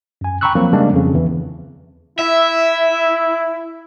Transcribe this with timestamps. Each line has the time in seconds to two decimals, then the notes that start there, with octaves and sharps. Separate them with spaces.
0.21 F#2 G#5
0.41 G5 A#5 B5 C#6 E6 F#6
0.55 F3 F#3 A#3 C4
0.73 C#3 G3 G#3 A#3 D4
0.93 F2 C#3
1.14 E2 E3
2.19 E4 E5